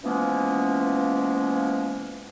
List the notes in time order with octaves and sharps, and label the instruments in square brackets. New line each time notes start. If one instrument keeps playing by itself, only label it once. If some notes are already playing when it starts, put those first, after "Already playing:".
[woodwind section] E3 F3 G#3 A#3 B3 C#4